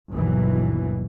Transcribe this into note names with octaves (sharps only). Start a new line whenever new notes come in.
G1 D#2 B2 E3 F#3